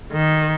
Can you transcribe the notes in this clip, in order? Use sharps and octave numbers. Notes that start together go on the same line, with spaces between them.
D#3